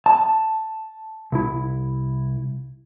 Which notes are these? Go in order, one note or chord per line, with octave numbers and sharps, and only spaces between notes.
A5
C2 E4